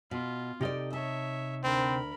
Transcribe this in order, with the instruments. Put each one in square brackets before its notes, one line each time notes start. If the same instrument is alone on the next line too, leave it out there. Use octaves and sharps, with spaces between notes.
[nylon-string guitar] B2 [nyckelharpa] F4
[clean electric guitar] C3 D#4 D#5 [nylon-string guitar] G4 A4 D5
[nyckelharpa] C#5 E5 [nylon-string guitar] A5
[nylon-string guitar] D2 [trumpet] C4 [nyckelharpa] A#4 B5